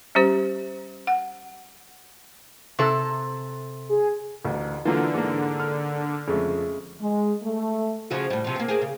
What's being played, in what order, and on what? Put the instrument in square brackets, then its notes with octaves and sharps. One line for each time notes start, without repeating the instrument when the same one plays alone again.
[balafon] G3 C#4 G4 C5
F#5
[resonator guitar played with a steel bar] C3 A4
[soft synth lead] G#4
[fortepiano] A1 [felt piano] D2
[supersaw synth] D3 [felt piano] E3 [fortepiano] F#3 A#3 F4
[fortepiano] G#2 A#3
[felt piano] F6
[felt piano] F2 [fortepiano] C#3 G#3 A3
[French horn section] G#3
A3
[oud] C#3 F3 F#4
A2 G3
C3 F3
A#3 C4
A#3 G4 G#4
C#3